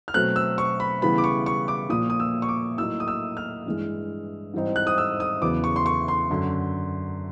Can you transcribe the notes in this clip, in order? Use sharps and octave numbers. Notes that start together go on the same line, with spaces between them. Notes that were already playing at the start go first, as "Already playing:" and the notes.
F6
B2 F#3 A3 C4 F#6
E6
C#6
B5
C#3 E3 G3 B3 B5
D6
C#6
C#6
D6
A#2 F3 A#3 D#6
D#6
E6
C#6
D6
A2 F#3 A#3 D#4 E6
D#6
E6
F6
G2 E3 G#3
G#2 E3 G3 C4 D#4
F#6
D#6
E6
D#6
E2 C#3 F#3 B3 D6
C#6
C6
C#6
C6
F#2 D3 F#3